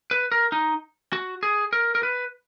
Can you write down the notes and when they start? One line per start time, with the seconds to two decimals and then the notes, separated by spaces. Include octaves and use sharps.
0.11 B4
0.32 A#4
0.52 D#4
1.13 F#4
1.43 G#4
1.73 A#4
1.95 A#4
2.03 B4